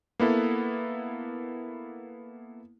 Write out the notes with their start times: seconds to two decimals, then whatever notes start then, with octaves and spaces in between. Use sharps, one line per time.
0.20 A#3 B3 E4 A4